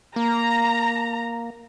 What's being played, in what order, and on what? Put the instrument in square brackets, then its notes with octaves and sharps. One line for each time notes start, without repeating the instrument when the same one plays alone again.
[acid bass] A#3 [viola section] A#5